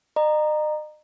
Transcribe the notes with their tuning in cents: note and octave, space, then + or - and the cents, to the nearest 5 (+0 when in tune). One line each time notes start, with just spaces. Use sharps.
D#5 -40 A#5 +0